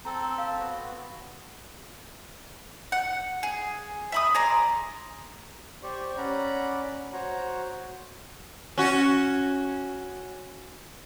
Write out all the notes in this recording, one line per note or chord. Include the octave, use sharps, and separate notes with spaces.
C4 A4 A#5
F5
B3 F#4
F#5
G#4
E5 B5 D#6
G#4 D5 A#5 C6
G4 C5 D5 C#6
C#4 D5 F#5 A#5 B5
F#4 C5 C#5 F#5 A#5
C#4 F#4